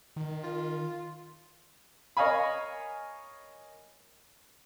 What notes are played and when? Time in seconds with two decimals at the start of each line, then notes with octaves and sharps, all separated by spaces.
0.16 D#3
0.43 F4
2.17 A#4 C#5 D#5 F5 G#5 B5